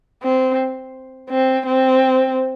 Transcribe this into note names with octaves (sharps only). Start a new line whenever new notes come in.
C4
C4
C4